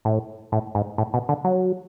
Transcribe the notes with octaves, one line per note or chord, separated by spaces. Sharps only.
A2
A2
G#2
A2
B2
D3
F#3